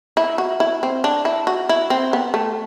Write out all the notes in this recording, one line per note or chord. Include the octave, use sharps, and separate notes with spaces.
E4
F#4
E4
C4
D4
E4
F#4
E4
C4
B3
A3